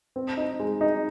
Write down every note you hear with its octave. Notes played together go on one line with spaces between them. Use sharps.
C4
D#4
G#3
D#4